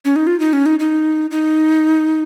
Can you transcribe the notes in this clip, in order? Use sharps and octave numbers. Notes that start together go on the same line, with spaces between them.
C#4
D#4
F4
D#4
C#4
D#4
D#4
D#4